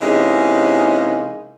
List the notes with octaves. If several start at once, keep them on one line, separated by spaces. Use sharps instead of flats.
C3 E3 G#3 A#3 C#4 D#4